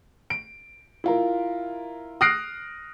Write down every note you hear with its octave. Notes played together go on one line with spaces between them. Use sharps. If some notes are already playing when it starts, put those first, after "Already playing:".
D7
E4 F4 A#4
D#6 F6 F#6 A#6 C7 D7